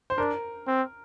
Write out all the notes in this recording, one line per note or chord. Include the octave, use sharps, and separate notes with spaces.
C5
D4 A#4
C4